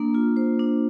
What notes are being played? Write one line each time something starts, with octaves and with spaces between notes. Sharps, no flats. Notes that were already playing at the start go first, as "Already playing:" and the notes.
Already playing: A#3 D4
F4
C5
D4